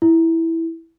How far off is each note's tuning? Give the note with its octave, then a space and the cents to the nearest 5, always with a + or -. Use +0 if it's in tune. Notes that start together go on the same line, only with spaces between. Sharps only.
E4 -5